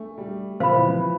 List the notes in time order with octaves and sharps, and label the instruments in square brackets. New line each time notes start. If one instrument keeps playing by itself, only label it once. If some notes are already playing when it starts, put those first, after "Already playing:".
Already playing: [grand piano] A3 [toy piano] D4
[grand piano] G3
[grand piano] F3 [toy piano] C5 F5 B5
[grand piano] E3
F3